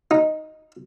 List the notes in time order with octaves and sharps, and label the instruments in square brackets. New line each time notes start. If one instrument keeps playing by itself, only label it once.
[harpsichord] D#4